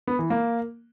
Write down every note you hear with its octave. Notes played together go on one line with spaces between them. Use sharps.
B3
E3
A#3